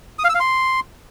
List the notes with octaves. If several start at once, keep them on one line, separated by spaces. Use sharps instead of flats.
D#6
F5
E6
F5
C6